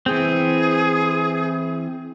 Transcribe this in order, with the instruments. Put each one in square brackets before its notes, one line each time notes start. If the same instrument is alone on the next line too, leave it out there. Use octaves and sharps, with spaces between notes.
[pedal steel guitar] E3 C4 [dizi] G#4